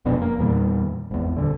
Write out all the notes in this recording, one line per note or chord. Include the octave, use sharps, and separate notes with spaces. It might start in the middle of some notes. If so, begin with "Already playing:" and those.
F#1 F2 B2 D4
A#3
E2 A#2 D#3 G3
G#1 E2
D#1 D3